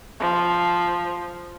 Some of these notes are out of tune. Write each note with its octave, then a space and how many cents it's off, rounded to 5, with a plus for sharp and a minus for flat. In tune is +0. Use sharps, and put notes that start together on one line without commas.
F3 +0